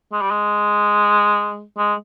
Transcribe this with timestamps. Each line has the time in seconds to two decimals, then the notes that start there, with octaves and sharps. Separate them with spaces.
0.12 G#3
0.21 G3
0.31 G#3
1.78 G#3